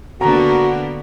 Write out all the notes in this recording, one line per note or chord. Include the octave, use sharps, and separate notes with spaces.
D3 A#3 B3 F#4 A#5